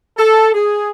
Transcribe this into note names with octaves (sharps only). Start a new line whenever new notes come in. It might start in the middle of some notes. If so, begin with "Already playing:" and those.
A4
G#4